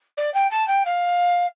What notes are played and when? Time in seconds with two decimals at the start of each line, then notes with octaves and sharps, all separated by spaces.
0.17 D5
0.34 G5
0.51 A5
0.68 G5
0.86 F5